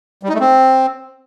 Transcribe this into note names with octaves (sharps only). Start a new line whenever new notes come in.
G3
D#4
A3
C4